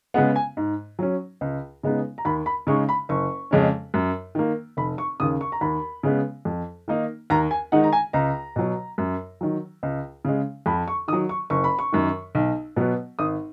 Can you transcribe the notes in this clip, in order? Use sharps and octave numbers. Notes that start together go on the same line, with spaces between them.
C#3 G#3 B3 F#5
G#5
G#2
F#3 C#4
C#2
C#3 G#3 B3 D#4
A#5
D#2 B5
B5
C#3 G#3 D#4 C#6
B5
F#1 C#6
F2 C#3 G#3 C#4
F#2
D#3 A#3
F1 B5
C#6
D#2 C#3 D#6
C#6
A#5
D#2 B5
C#3 G#3 B3
F2
D#3 A#3 D#4
D#2 A#5
G#5
D#3 G#3 D#4 F#5
A#5
G#5
C#2 A#5
B2 F#3
F#2
D#3 F#3
C#2
C#3 G#3
F2 B5
C#6
D#3 F#3 D#6
C#6
F#1 C#6
B5
C#6
F#2 D#3
B1
B2 F#3 B3
G#1 D#6